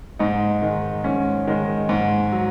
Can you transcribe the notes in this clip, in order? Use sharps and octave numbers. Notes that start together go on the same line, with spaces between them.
G#2 D#4
D#3 G#3
G#2 C#4
D#3 G#3
G#2
F#3